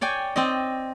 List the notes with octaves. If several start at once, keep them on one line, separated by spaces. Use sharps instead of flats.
C#5 D5 G5 G#5
C4 D5 D#5